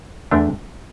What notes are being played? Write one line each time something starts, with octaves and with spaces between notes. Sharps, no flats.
E2 D3 A3 D4